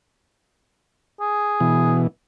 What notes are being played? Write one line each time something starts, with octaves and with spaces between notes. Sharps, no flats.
G#4
B2 E3